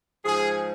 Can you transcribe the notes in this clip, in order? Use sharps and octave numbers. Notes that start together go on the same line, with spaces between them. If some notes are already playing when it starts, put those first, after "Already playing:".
G#2 F3 G#4